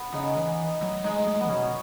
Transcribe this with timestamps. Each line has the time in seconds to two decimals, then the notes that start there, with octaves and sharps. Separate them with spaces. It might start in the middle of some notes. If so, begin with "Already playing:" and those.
Already playing: B3
0.14 C#3 D#4
0.37 E3
0.82 F#3
1.04 G#3 D#4
1.28 G#3
1.41 B3
1.49 B2 C#4